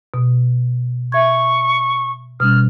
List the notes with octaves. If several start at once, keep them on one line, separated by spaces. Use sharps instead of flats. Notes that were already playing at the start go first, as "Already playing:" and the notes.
B2
E5 C#6 G#6
B2 G3 C#4 F6